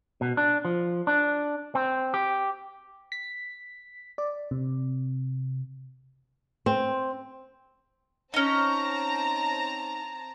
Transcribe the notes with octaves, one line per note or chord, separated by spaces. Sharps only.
B2
D4
F3
D4
C4
G4
B6
D5
C3
C4
C4 C#4 D#4 A5 A#5